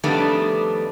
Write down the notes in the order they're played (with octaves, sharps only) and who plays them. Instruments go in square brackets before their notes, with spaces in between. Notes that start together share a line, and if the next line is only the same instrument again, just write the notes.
[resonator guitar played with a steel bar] F2 D#3 G3 A3 B3 D4